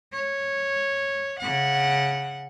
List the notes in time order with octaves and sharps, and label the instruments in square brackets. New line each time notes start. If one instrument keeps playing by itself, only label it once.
[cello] C#5
C#3 F#5